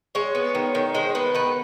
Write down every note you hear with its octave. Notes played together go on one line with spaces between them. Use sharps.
G#3 C#5
B3
D#3
D#3
G#3 C5
B3 B4
D#3 B4